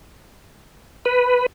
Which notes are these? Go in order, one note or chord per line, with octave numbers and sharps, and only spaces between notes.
B4